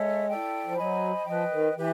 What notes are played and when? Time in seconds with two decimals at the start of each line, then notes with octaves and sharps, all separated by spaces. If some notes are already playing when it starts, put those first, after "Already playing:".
Already playing: G#3 A4 C#5 E5
0.29 E4 A4 D5 G5
0.66 F3
0.77 F#3 C5 D#5 G#5 B5
1.27 F3 B4 D#5 G5
1.52 D#3
1.76 E3 G4 B4